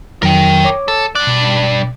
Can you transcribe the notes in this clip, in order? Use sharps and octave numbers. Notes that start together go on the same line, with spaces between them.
F2 D#3 F#3 A#4 G5
C#5 D6
A4
G2 D5 F#6
B2